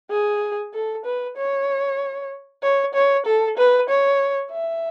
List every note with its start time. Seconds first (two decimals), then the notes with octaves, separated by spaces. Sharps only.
0.10 G#4
0.73 A4
1.05 B4
1.37 C#5
2.62 C#5
2.94 C#5
3.26 A4
3.57 B4
3.89 C#5
4.52 E5